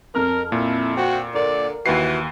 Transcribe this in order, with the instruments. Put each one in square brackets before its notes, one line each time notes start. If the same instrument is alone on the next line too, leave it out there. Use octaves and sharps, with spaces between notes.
[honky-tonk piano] F2 F6 [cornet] A#4
[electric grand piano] A#2 [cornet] E4
[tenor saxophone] C4 [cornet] F#4
[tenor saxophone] D3 [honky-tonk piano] A#4 [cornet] D5
[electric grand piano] D#2 B4 C7 [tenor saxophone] E3 [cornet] F#4